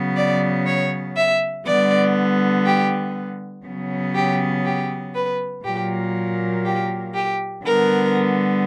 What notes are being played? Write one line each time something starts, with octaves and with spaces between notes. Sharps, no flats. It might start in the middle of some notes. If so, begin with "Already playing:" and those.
Already playing: C#3 F#3 B3
D5
C#5
E5
D3 G3 B3 D5
G4
C#3 F#3 B3
G4
G4
B4
A#2 F#3 A#3 G4
G4
G4
D3 G3 B3 A#4